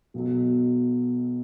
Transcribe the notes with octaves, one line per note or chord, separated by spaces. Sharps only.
B1 B2 F#3